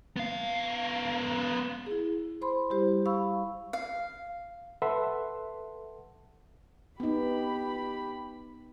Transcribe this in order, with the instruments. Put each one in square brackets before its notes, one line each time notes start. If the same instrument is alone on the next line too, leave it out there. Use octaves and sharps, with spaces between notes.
[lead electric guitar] B3 F5
[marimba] E4 G#4
C5 B5 C6
G3 E4 G4 C5
F5 B5 C#6 E6
[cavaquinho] F5
[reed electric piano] A4 B4 E5 F#5 C6
[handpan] B3 D#4 [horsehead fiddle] G4 B5